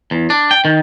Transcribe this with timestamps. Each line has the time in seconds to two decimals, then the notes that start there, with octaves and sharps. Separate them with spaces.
0.11 E2
0.30 D4
0.51 G5
0.65 D#3